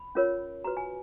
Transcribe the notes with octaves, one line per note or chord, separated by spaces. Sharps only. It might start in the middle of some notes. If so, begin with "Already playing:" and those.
Already playing: B5
C#4 F4 A#4 C#5
F#4 B4 A#5
G#5